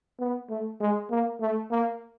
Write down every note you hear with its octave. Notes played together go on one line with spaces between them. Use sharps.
B3
A3
G#3
A#3
A3
A#3